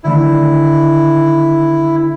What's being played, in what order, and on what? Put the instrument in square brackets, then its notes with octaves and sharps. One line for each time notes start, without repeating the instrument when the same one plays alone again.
[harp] D3 D#3 A3 [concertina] E4